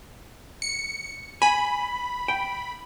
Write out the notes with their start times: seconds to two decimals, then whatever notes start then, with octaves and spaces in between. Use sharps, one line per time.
0.62 C#7
1.42 G#5 B5
2.28 G5